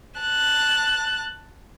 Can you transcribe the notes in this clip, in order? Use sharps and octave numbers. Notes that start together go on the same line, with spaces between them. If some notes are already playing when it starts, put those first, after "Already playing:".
A5 F#6